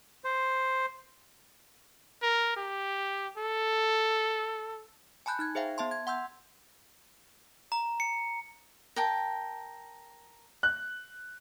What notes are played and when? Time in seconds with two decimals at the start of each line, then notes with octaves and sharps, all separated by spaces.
0.24 C5
2.22 A#4
2.56 G4
3.38 A4
5.26 G#5 A5 B5 F#6 G6
5.39 D#4 F#6 G#6
5.55 G#4 C5 E5 F5 G5
5.78 B3 E5 A5 C6
5.91 G#6
6.07 F#5 C6 E6 G6
7.72 A#5
8.00 C#7
8.96 A#4 G5 A5
10.63 F#6